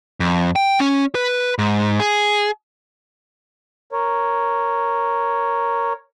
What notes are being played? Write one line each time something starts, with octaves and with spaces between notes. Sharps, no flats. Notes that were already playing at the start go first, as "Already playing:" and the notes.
F2
G5
C#4
B4
G#2
G#4
A#4 C#5